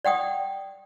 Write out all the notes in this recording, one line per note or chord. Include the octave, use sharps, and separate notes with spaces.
D5 F#5 G5 D#6